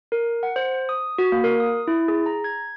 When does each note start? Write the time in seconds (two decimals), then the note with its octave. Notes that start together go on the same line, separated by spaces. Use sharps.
0.12 A#4
0.43 F#5
0.56 C5
0.89 D#6
1.18 F#4
1.32 A#3
1.44 A#4
1.60 D#6
1.88 E4
2.08 G#4
2.26 A#5
2.44 G#6